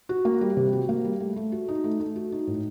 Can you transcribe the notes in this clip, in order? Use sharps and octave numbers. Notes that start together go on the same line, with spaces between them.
F#4
A#3
G3
C3
F#4
A#3
G3
A3
A3
F#4
D#4
A3
A3
F#4
D#4
A2